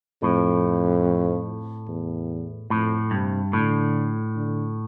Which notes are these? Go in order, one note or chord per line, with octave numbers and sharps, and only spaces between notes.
F2 A2
E2
F2 A2
G2 C3
A2 D3
D3